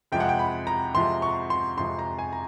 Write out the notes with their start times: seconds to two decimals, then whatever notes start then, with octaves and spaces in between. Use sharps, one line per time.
0.12 F2 C3 F3 G#3 G5
0.20 F#5
0.29 G5
0.39 B5
0.67 A#5
0.95 F2 C3 F3 G#3 C6
1.22 C#6
1.50 C6
1.78 F2 C3 F3 G#3 C6
1.99 A#5
2.19 G#5
2.32 A#5